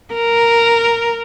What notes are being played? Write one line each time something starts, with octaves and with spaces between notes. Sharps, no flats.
A#4